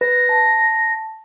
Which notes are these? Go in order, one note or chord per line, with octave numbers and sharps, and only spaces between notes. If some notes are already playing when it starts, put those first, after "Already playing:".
B4 A#6
A5